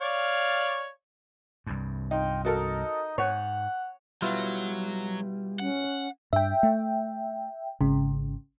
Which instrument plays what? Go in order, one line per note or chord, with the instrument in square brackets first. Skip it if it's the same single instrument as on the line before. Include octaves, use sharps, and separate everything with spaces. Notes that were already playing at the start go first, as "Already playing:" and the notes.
[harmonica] C#5 D5 F5
[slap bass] C2 G2
[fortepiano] D#4 [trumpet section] F4 G5
[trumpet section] D#4 D#5 [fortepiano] F#4 A4 A#4
[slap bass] G#2 [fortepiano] C#5 [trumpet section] F#5
[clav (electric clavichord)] B2 E4 F4 [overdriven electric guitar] F#3 [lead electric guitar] G3
[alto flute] C#4 [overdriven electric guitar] F#5
[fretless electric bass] G2 [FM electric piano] E5 G5
[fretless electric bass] A3
[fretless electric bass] G#1 [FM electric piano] C#3